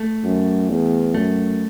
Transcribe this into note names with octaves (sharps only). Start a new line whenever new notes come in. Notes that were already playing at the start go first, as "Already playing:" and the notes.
Already playing: A3
F#2
E2
F#2 A3